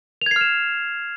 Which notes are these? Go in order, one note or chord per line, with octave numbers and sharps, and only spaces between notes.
F6 G#6 C7 E7 F7